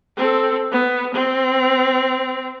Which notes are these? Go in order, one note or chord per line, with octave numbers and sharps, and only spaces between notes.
C4 A4
B3
C4